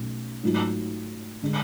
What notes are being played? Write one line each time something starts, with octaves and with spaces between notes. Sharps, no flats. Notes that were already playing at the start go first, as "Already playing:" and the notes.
Already playing: B1 B2 A3 C#4
G#2 F#3 A3 F4
D3 G#3 D4